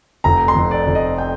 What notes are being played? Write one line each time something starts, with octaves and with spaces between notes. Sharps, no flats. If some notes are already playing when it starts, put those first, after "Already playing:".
F1 A#5
C6
F2
D5
F1
D#5
G5